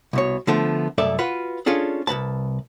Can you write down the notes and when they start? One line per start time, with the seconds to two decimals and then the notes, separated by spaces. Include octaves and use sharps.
0.13 C2 B2 C#5
0.47 D3 F3 A3 B3
0.98 C2 F#2 A3 A4 D5 E5
1.19 F4 F#4 B4
1.66 C#4 D4 F4 G#4 A4
2.07 C2 G2 B4 A5